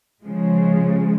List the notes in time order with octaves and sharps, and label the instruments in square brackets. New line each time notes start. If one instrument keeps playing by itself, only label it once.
[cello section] C#3 F3 G#3